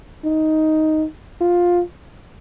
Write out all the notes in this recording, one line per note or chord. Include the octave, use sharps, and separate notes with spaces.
D#4
F4